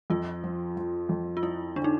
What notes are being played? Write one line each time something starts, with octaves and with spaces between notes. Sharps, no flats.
F2 F4
F3
F3
F2
F4
F3 E4
D3 D4
D#4